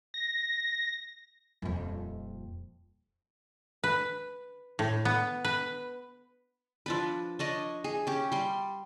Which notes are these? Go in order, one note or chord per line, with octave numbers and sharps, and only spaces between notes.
A#6
D#1 F2
B4
A2
B3
B4
F3 D4 B4
D4 C#5 D#5
G#4
C#4 G4
G3 C6